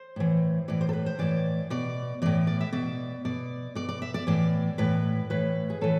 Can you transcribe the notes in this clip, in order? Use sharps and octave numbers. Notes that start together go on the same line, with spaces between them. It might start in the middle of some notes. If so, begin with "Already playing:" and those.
Already playing: C5
A2 E3
A2 E3 D5
C5
A4
B4
C5
A2 E3 D5
B2 D5
A2 E3 D5
D5
E5
B2 D5
B2 D5
B2 D5
D5
E5
D5
A2 E3 D5
A2 E3 B4
A2 E3 B4
G#4
A2 E3 A4